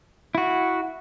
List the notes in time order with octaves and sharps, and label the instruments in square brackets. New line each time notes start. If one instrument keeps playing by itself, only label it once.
[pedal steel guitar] E4 F#4